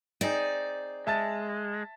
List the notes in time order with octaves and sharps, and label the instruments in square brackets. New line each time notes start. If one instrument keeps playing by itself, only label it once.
[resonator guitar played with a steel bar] C4 D#4 G#4 [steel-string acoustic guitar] D5
[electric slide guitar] G#3 [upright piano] E5 A5 A6